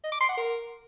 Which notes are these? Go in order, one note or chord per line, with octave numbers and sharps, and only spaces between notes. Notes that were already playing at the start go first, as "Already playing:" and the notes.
D#5
D6
C6
F#5
A#4